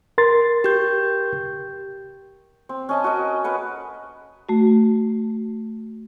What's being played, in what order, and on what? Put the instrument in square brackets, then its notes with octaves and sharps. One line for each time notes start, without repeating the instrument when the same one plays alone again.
[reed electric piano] A#4 C6 A6
[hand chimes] G4 G6
[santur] C4
C#4 D#5 A5
F#4 A#4 D#5
A#4 B4 F#5
[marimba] A3 F#4